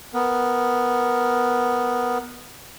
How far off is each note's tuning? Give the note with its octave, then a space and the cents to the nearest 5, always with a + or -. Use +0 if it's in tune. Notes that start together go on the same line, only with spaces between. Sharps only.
B3 +0 A#4 +0